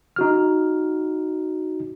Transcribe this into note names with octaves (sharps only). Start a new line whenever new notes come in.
D#4 F#4 F6